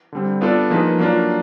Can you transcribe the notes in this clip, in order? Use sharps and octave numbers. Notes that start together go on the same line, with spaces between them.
D3 G3 C4
B3 D4 F4 A4 D5
F3 A#3 D#4 G#4 B4
F#3 A#3 D4 F4